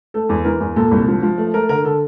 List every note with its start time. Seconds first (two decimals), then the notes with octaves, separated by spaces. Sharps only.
0.14 A3 A4
0.29 E2
0.45 E3 A#4
0.60 E2
0.76 A#2 A4
0.91 C2
1.08 F3
1.22 F3
1.38 A3
1.54 A3 A#4
1.69 D3 A#4
1.84 D3 A4